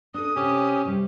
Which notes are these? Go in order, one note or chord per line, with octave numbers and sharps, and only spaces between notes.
D4 A4 D#6
C3 C#4 G4
C3 G3